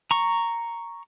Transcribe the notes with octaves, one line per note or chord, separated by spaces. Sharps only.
A#5 C#6